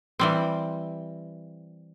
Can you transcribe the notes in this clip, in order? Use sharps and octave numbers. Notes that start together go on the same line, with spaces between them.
E3 G3 C4